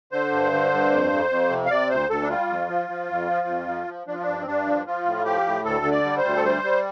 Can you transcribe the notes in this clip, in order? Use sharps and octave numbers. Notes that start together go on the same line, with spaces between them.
D3 C5
G2
D3
G2
F2
F2
F2
C3
F5
C3 D5
D2 C5
D2 A4
D4
G3 F4
F2
F3
F3
F2
F3
F2
F3
F3
F3 D4
F4
D4
G2
C4
G2 D4
F3
F3 F4
A2
F3 G4
A2
D2 A4
D3
D5
G3
C5
D2
A4
G3 C5
G3